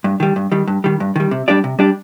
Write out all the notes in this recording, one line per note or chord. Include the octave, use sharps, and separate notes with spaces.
G2
D#3 G3
G2
D#3 G3
G2
D#3 G3
G2
D#3 G3
C3
G3 D4 G4 D5
C3
G3 D4 G4 D5